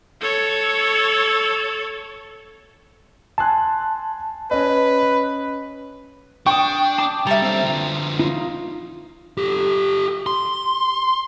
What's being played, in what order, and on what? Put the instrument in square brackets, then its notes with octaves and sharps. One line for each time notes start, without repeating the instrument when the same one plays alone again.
[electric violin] A4 C#5
[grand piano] G#5 C6 F#6 [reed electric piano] A5
[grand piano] C#4 D#5 [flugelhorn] B4
[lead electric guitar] D4 [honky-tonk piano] G5 [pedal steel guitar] C#6 D#6
[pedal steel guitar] A5 D6
[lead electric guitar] G3 [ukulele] A4 E5 [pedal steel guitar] A#5
[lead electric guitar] C4 D4
D3 F3
[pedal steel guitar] D#4 F4
[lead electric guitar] G4 A4
C6